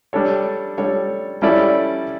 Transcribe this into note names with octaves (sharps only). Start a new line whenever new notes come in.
G3 D4 A4 C#5
G3 D4 A4 C#5
G3 C#4 E4 A4 D5